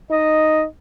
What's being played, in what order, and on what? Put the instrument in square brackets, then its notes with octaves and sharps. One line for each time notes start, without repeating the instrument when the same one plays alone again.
[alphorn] D#4 [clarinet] D#5